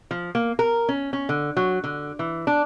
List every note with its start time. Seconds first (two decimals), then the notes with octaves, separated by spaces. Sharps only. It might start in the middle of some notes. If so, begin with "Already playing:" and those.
0.11 F3
0.35 A#3
0.59 A#4
0.89 C#4
1.13 C#4
1.29 D3
1.57 F#3
1.84 D3
2.19 E3
2.47 D4